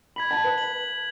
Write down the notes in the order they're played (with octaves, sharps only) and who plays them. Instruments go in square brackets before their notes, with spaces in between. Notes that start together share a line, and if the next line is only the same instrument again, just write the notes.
[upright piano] B5 [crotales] G#6 B6 F#7
[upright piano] A5
B4
[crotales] F#7